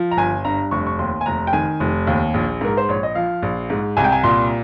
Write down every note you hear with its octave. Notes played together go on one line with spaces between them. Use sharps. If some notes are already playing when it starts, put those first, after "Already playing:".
Already playing: F3
A#5
G1 G#5
G2 A#5
F1 C#6
C#6
D#2 C6
G#5
F1 A#5
G5
D#3 G#5
F1
D#2
A#1
G#2 A#4
C5
A#1 C#5
D#5
F3 F5
A#1
G#2
C2 G#5
G5
G#5
A#2 C6